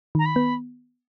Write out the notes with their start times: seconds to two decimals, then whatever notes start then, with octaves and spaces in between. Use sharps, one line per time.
0.15 D#3 A#5
0.26 B5
0.36 B3